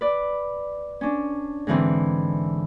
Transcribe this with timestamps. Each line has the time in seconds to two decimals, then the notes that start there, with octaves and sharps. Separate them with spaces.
0.01 B4 D5
1.01 C#4 D4
1.67 G#2 D3 E3 C4